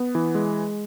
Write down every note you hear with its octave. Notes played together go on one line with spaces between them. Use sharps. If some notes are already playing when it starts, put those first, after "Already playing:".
Already playing: B3
E3
G#3